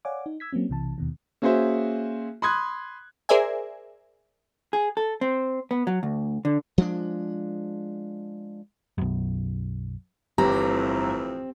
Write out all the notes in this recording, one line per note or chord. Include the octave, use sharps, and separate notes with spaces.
C#5 D5 F5 F#5 G#5 D6
D#4
E6 G#6 B6
F#3 A#3 C4 C#4
B1 C3 E3 A5
D#2 B2 D#3
A#3 C#4 F#4 G#4 C5 E5
B5 C6 D#6 F#6 G#6
G#4 A#4 C5 D5 E5 G#5
G#4
A4
C4
B3
F#3
D2
D3
F3 G#3 C4 D4
B1 F#2
G1 F2 A2 E3 C4 G4 A#5